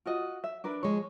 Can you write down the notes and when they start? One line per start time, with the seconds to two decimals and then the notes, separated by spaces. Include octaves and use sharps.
0.06 F4 F#4 D#5
0.44 E5
0.64 D4 A#4 B4
0.83 F3 G#3 C#5